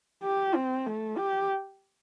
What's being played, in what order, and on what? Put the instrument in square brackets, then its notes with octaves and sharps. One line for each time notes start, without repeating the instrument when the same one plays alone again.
[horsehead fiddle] G4
C4
A3
G4